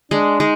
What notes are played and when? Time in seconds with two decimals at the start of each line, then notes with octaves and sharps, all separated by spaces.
0.11 G#3 D4
0.40 G#3 D#4